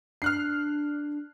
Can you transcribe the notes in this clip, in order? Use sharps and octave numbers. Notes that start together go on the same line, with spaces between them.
D4 F6 F#6 C7